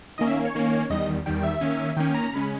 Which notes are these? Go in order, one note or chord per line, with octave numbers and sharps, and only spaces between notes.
D#3 A#3 C#4 D#5
E5
C#5
D#3 A#3 C#4
E2 D#3 G3 D#5
E2 D#3 G3 G5
G5
E5
D#3 A#3 C#4
D#3 A#3 C#4 G5
A#5
C#3 G#3 C#4 B5